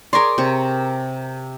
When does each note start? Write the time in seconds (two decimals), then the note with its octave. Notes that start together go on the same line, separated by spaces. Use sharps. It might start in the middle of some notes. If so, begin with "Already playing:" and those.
0.13 G#4 A#4 C#5 D5 C6
0.38 C3 C#6